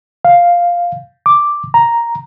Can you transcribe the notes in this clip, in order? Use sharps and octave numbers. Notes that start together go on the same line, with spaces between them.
F5
D6
A#5